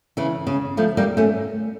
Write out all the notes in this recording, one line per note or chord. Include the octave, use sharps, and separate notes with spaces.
C#3 E3
C#3
F3 A3
G3 A#3
A3 C#4